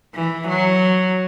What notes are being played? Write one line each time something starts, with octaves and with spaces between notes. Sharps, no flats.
E3
F#3